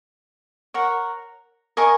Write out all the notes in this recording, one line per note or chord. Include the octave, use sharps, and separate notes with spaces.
A#4 C#5 F#5
A#4 D#5 G#5 C#6